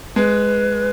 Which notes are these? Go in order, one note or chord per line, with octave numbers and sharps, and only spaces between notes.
G#3 B4